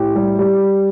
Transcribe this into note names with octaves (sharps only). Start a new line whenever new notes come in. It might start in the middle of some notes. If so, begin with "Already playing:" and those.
Already playing: A2 G4
G3
G3